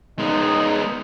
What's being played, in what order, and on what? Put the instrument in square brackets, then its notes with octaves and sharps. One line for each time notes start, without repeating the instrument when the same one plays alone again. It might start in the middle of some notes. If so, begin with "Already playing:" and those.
[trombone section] C#3 D#4 [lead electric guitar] G#3 B3